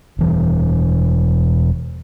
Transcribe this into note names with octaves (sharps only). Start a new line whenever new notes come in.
E1 E3 G3